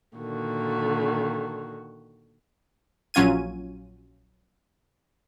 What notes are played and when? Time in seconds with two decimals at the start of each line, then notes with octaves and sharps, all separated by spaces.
0.16 A#2 D3 D#3 F#4
3.14 A#1 F#3 C#4 F4 G#6 D#7